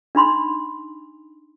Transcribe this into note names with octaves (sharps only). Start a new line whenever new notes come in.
D4 D#4 B5 C6